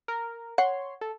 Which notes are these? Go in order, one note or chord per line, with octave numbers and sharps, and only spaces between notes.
A#4
C#5 F#5 C6
A4